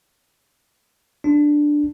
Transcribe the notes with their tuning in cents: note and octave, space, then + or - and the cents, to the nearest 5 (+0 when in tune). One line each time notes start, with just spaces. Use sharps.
D4 +5